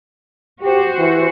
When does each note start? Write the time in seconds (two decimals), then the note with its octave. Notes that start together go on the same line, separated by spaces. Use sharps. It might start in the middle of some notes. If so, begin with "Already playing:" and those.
0.62 F#4 G4 C5
0.99 E3